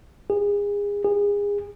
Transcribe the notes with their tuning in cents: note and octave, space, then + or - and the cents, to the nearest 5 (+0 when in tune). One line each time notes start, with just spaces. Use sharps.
G#4 -30
G#4 -30